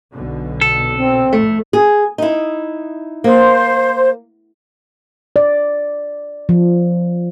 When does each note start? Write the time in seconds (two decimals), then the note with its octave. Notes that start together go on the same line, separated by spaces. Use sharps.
0.13 B1 B2 D3
0.61 A4
0.94 C4
1.33 F2 A2 A3
1.73 G#4
2.18 D#4 E4
3.24 A#3 C5
5.36 D5
6.49 F3